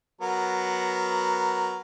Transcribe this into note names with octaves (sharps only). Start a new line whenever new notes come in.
F#3 B3 A#4